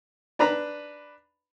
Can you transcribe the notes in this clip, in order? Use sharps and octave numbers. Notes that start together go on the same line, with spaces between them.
D4 B4 A#5 B5